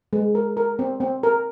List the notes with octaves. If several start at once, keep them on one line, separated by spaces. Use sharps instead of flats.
G#3
A#4
A#4
C4
C4
A#4